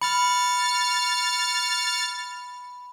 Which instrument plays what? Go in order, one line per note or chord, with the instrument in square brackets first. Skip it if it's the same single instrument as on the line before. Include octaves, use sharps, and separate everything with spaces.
[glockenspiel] B5 [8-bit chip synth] F6 A6 C#7